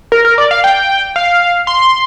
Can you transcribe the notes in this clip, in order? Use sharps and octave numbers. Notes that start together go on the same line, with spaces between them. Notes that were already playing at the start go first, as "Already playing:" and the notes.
A#4
A#4
D5
F5
G5
F5
C6